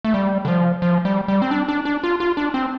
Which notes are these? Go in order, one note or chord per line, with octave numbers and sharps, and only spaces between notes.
A3
G3
D3
F3
F3
G3
G3
C4
D4
D4
D4
F4
F4
D4
C4